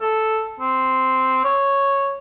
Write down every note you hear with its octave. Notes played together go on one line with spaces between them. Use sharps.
A4
C4
C#5